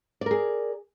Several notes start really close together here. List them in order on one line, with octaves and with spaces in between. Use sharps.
D5 A#4 G#4